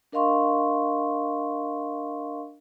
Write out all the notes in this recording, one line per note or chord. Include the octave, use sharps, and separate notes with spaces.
D4 A#4 D#5 F5 C6 C#6